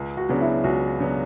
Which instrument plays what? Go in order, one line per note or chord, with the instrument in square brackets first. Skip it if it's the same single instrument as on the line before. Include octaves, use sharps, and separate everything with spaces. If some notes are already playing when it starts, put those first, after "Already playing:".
Already playing: [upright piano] C#2
[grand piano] F#4
[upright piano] C#3 F#3 B3 D4
[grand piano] E4
[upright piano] C#2 [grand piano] F#4
[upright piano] C#3 F#3 B3 D4